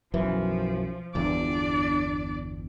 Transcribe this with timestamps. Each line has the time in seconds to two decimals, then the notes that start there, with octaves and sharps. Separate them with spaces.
0.14 B1 F#2 E3 F3
1.15 G1 E2 D4 D5